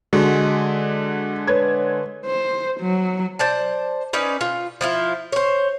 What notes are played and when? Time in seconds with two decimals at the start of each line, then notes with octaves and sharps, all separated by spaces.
0.13 D3 G#3 F#4
1.47 B4 C#5 G#6
2.26 C5
2.81 F#3
3.39 C5 D5 A5
4.13 C#4 D#4 B4 D5
4.41 F4
4.81 F3 E4 F4
5.32 C5 C#5